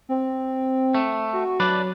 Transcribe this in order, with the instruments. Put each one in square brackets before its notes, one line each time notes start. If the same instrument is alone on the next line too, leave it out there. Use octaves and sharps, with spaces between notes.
[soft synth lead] C4
[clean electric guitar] A3
[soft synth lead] F#4
[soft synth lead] F#3 [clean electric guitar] D4 B4 D5